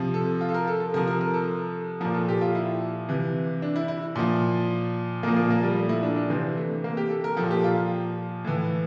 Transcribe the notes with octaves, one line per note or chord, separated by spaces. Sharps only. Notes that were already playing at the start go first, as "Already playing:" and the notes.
Already playing: C3 F3
A4
F4
A4
A#4
A4
A4
C3 F3 A#4
A#4
A#4
A4
A#2 F3 A#4
A4
G4
F4
E4
C3 E3
D4
E4
E4
A#2 F3
A#2 F3 A#3
A#3
A#3
G3
A3
E4
D4
D4
C3 E3 C4
A3
A#3
G4
A4
A#4
F3 A4
A#2
G4
F4
A2 E3